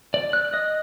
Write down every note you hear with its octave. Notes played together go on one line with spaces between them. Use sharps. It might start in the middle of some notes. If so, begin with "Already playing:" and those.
D5
F#6
D#5